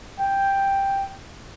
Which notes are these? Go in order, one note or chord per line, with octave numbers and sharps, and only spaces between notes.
G5